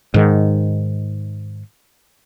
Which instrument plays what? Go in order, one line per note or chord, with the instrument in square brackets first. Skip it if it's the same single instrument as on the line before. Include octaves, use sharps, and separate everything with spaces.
[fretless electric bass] G#2 D#3